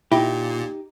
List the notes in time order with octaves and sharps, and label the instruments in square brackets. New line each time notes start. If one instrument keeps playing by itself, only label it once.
[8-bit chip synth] A#2 [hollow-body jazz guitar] D#4 G4 [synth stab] E4